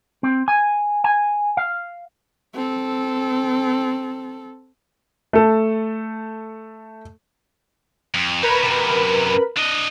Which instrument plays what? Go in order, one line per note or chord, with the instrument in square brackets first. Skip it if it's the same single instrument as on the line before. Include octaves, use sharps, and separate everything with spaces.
[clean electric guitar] C4
G#5
G#5
F5
[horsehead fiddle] C4 A4
[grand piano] A3 A4
[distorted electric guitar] F2
[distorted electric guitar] D#4 C#5 [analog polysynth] A#4 B4 B5
[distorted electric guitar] F#2 C3
D4 D#5